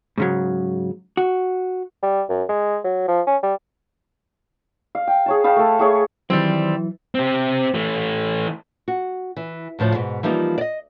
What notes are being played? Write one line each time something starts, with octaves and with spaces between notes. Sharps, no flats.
G#2 C#3 F#3
F#4
G3
F#2
G#3
F#3
F3
C#4
G3
F5
G5
G#4 C#5 A5
B4 F5 G5 A5
A3 A4
A3 G#4 C#5
D#3 E3 F#3 G3 C4 C5
C4 G4
E3 A3
F#4
E3
D2 A2 F3 C5
G#2 B2
E3 F3 G3 A#3 D#4 F4
D5 D#5